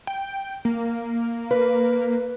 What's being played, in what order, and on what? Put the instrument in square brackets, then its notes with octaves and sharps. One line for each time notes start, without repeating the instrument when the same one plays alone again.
[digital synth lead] G5
A#3
[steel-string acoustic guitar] B4